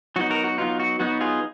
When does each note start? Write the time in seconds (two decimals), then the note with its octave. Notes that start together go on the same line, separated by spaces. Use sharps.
0.16 F#3 B3 D#4 F#4
0.30 F#4 A#4
0.44 F#4
0.58 F#3 B3 D#4 F4
0.80 F#4
1.00 F#3 B3 D#4 F#4
1.21 F4 G#4